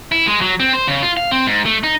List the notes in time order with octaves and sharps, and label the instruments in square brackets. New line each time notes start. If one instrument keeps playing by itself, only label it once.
[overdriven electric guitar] E4
G#3
F#3
C4
C5
C#3
F4
F5
C4
G#2
A3
D#4